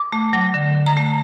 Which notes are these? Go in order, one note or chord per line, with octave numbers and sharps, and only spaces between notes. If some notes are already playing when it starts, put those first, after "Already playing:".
Already playing: D6
A3
F#3
D3
D3
A#5
A3